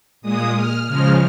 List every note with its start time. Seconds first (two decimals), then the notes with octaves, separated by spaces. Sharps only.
0.22 A#2 G#3 D#6
0.55 F6
0.86 C#3 F3 G#3 F6